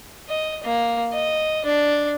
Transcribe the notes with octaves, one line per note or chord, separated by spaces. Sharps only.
D#5
A#3
D#5
D4